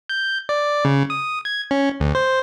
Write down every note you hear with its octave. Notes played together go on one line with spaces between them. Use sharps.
G6
D5
C#3
D#6
G#6
C#4
D2
C5